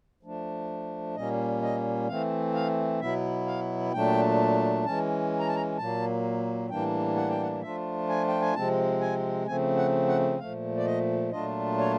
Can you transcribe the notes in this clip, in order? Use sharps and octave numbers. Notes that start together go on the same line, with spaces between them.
F3 A3 D4
A#2 G3 A#3 C#4 D#5
D#5
E3 A3 C4 F5
F5
B2 F#3 B3 E4 E5
F5
A#2 F#3 A3 D4 G5
E3 G#3 C#4 A5
A#5
A5
A#5
A#2 F#3 A#3 A5
A2 E3 G3 A#3 D4 G5
F#5
G5
F#5
F3 A3 D4 F4 E5
G#5
G5
G#5
C3 F3 G#3 C4 A5
G#5
C#3 F3 A3 C4 G#5
F#5
F#5
A#2 F3 A3 F5
D5
D#5
A#2 F#3 A3 D4 F4 D#5
C#5